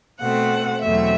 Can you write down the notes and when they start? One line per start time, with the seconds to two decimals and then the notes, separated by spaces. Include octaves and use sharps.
0.19 B2 A3 C4 F#5
0.81 E2 B2 F#3 A3 C4 E5